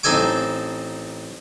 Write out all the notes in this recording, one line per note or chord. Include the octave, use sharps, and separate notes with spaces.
A1 C4 D#4 A4 G#5 D6